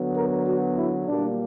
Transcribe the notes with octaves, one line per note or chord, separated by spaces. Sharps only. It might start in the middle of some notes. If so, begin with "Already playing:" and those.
Already playing: D3 F#3 B3
A#4
F#4
E4
A#2 G3 A#3 D4